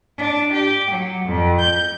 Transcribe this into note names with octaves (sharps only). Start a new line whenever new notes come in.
D4
G4
F#3
F2
G6